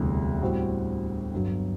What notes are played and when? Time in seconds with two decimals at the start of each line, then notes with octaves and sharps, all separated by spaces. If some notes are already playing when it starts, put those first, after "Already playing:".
Already playing: E1 D2 C3 E3 G3
0.42 A2 G3 C4 F#4
1.33 G1 G2 F#3